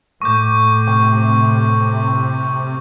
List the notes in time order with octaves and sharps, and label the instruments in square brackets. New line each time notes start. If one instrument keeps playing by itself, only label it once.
[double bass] A2 [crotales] C#6 D6 G6
[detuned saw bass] C3